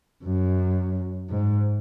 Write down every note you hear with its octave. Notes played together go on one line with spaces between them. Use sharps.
F#2
G#2